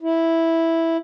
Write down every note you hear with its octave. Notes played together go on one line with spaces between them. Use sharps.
E4